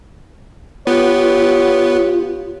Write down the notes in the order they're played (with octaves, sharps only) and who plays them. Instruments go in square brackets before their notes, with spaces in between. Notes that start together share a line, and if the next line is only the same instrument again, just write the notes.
[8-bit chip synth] B3 [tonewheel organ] F4 [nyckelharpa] G4 [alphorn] C#5